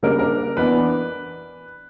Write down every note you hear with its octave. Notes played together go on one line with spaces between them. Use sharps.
C#3 G3 A#3 D4 A#4
A#4
E3 B3 D4 B4